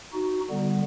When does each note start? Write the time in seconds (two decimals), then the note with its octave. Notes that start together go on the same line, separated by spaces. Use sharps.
0.13 D#4 F#4
0.50 D3 G3 B3